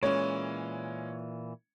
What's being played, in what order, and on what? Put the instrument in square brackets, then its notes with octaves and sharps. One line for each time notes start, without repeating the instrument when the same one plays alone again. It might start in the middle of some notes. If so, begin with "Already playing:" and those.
[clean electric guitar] A#2 E3 [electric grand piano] G#3 C#4 [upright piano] C#5